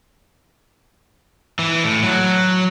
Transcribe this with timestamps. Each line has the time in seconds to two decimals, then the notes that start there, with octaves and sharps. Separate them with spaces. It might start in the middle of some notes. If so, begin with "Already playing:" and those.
1.59 E3
1.84 A2
2.03 F#3